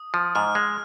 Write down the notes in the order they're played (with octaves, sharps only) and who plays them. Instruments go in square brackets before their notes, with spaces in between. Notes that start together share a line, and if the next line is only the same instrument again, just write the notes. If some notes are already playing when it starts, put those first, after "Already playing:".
Already playing: [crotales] D#6
[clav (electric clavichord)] F3
[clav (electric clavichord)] G#2 [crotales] F6
[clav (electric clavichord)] G#3